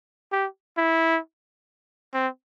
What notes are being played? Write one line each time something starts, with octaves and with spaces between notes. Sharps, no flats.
G4
E4
C4